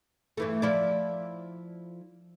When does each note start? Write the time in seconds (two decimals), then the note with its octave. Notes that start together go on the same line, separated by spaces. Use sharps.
0.37 G2 E3 A3
0.62 F3 E4 D5